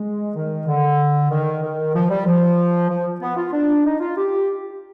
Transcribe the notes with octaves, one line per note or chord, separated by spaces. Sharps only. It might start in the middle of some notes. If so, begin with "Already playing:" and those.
Already playing: G#3
D#3
D3
D#3
D#3
F3
G3
F3
F3
B3
F4
D4
D#4
F4
G4